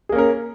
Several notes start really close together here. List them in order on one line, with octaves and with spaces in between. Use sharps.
G#4 A#3 C#4 A#4